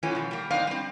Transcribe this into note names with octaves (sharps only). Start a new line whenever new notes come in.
E3 F3 A3 B3 C#4
B2 F3
G3 A#3
C4 D4 D#4 C5 F5
G3 C4